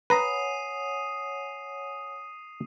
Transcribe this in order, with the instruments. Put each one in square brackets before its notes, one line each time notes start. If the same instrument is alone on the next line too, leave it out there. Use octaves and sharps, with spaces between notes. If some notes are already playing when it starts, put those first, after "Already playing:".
[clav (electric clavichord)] B4 A#5 [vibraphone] C#5 F#5 G#5 [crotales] D#6 C7 D#7